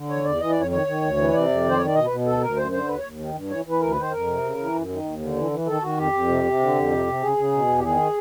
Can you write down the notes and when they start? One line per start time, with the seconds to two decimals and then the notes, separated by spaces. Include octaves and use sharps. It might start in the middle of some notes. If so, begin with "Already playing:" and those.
Already playing: D3
0.09 E2 C#5
0.24 E2 D5
0.40 E3 D#5
0.50 D5
0.55 F2
0.60 C#5
0.71 D#3 C#5
0.87 D#3
1.02 D2
1.17 E3
1.33 C3 D5
1.49 F2
1.64 D#3 C5
1.77 D#3 C#5
1.86 D5
1.95 B2 D#5
2.05 B4
2.10 B2
2.26 D2 A4
2.41 D2 A#4
2.57 F#2 C5
2.72 D3 C5
2.87 D#2 B4
2.98 C#5
3.03 D#2
3.19 D#3
3.34 G2
3.50 E3 C#5
3.65 E3
3.70 B4
3.81 D2 A#4
3.91 B4
3.96 D#3
4.01 C5
4.11 F2 A#4
4.27 C3
4.43 C#3
4.58 E3
4.74 F#2
4.89 D#3
5.04 D#2
5.20 D3
5.35 E3
5.51 E3
5.66 D#3 A4
5.82 D#3 F#4
5.97 F2 G4
6.12 F2
6.28 C3
6.44 C3
6.60 D3
6.75 F2
6.90 C3
7.06 C3
7.21 C#3 G#4
7.37 C#3
7.52 B2
7.68 E2
7.79 G4
7.83 D#3 G#4